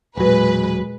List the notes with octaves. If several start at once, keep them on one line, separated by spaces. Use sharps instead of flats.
E1 A#2 F#3 G#3 B4